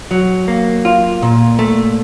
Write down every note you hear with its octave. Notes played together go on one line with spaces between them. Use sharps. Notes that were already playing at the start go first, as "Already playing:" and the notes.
F#3
A#3
F4
A#2
A3